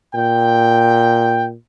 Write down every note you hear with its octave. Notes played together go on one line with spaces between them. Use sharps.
A#2 G5